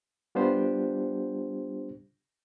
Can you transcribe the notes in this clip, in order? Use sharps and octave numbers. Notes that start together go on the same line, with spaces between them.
G3 B3 D4 F4 G4 C5